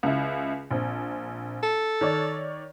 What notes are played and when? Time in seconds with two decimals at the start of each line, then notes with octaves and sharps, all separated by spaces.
0.03 C#2 E4
0.71 A#1 C4
1.63 A4
2.01 D#3 C#5 D5